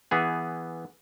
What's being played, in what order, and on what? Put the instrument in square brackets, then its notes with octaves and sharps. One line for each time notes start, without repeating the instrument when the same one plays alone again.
[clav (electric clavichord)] E3 B3 G#4